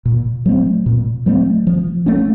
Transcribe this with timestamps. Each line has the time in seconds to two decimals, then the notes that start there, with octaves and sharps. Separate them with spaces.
0.05 A#2
0.46 F#3 A3 C4
0.86 A#2
1.26 F#3 A3 C4
1.67 F3
2.06 A3 C#4